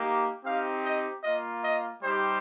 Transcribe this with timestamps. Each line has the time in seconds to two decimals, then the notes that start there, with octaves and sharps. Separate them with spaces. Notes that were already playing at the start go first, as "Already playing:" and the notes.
Already playing: A#3 D#4 G4
0.45 C4 D#4 G4 F5
0.84 D#5
1.24 A#3 F4 D#5
1.63 D#5
2.03 G3 D#4 G4 C5